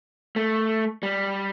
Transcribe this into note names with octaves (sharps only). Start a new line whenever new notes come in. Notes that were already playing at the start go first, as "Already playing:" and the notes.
A3
G3